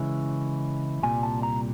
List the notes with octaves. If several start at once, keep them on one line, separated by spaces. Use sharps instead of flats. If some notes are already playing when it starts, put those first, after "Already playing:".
Already playing: C#3 E3 G#3 C#4 E4
C2 A#2 G3 G#5
A5
A#5